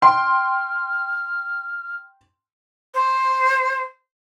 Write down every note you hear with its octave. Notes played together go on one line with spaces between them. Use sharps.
G5 C6 F6
C5